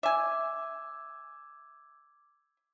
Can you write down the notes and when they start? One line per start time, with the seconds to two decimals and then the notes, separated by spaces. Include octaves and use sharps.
0.03 E5 G#5 D6 E6 G#6